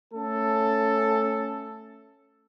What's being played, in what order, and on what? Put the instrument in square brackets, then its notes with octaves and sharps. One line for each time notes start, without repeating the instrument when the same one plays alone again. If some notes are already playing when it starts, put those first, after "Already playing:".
[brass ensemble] A3 C#4 A4